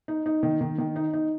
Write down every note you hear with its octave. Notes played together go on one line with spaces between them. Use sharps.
D#4
D#4
D#3
D#3
D#3
D#4
D#4